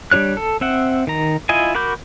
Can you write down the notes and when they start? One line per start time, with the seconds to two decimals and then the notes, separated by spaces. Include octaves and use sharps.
0.11 G3 D4 F4 C#5 F#6
0.37 A4
0.61 C4 E5 F#5
1.07 D#3 A#5
1.49 E4 F4 D#5 G#5
1.75 F#4 A#4 B5 D6 G6